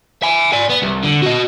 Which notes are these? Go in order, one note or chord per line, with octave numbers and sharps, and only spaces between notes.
E5 G#5
D5 G#5
B3
C2
D3
F#4 D#5